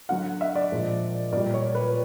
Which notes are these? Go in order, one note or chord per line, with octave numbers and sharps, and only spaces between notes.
D3 F#3 F#5
E5
D5
A#2 F3 G#3
A#2 G3 D5
C#5
B4